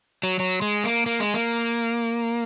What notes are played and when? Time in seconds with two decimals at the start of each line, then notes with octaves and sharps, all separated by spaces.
0.23 F#3
0.40 F#3
0.62 G#3
0.84 A#3
1.06 A#3
1.20 G#3
1.34 A#3